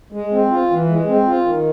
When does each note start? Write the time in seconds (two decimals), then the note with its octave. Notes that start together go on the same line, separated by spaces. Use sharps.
0.12 G#3
0.32 C4
0.50 F4
0.70 E3
0.89 G#3
1.08 C4
1.27 F4
1.45 D#3